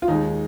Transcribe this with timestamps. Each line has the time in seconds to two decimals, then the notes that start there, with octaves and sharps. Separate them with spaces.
0.02 F4
0.08 D#2 D#3 G#3 D#4